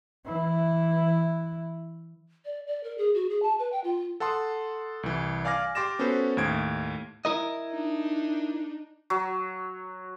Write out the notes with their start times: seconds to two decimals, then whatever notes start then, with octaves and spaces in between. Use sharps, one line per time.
0.25 E3 E4
2.45 D5
2.67 D5
2.83 A#4
2.98 G#4
3.14 F#4
3.29 G#4
3.42 A5
3.59 B4
3.72 G5
3.84 F4
4.20 A4 F#5 A5 C6 D#6
5.03 C2 E3
5.45 D5 F5 G#5 D6 F6 A#6
5.75 G4 C6 D6 A6 A#6 E7
5.99 B3 C#4 F#4 A4 B4 C5
6.37 D#2 A2 G#6 D7
7.25 E4 A#4 D#5
7.72 D4 D#4
9.10 F#3